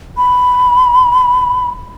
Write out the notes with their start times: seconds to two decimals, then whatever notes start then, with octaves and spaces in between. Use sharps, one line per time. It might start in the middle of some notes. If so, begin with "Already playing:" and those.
0.17 B5